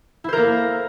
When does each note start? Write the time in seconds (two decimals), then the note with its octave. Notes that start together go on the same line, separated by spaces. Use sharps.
0.24 E4
0.28 C5
0.33 A#4
0.37 A#3